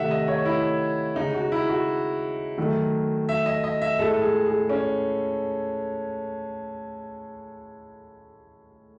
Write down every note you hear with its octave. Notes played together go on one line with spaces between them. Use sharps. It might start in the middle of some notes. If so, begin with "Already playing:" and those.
Already playing: C3 D#3 A3 E5 F#5
D#5
C#5
E4
C#3 G#3 D#4
F#4
E4
F#4
D#3 F#3 A3
E5
D#5
D#5
E5
A2 G#3 A4
G#4
G#4
C#4